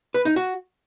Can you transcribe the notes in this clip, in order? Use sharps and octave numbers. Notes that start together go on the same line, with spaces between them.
B4
D#4
F#4